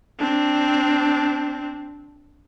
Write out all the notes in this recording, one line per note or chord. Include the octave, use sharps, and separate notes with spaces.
C4 D4